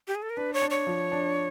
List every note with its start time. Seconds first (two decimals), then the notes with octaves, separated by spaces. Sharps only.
0.08 G4
0.15 G#4
0.22 A4
0.30 A#4
0.37 D4 B4
0.54 C#5
0.62 D4
0.70 C#5
0.87 F3
1.12 D4